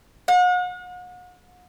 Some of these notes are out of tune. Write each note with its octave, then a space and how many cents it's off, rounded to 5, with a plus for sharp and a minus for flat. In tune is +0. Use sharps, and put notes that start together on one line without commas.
F#5 -40